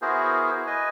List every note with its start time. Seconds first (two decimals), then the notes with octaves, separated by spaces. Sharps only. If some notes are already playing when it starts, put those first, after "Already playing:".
0.02 B3 E4 F#4 G#4 A#4 C5
0.67 B4 D#5 G#5